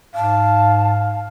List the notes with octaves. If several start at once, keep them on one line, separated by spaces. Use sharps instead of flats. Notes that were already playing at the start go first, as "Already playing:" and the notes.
G#2 F5 A5